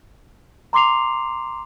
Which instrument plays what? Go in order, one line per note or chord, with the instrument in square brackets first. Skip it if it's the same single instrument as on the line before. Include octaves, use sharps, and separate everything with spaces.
[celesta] A#5 C6 D6 C7 F7